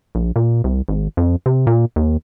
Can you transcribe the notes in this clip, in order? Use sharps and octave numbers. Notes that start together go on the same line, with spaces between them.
A#1
A#2
C2
G#1
F2
C3
A#2
D#2